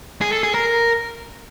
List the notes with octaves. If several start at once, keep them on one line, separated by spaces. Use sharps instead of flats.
G#4
A4
G#4
A#4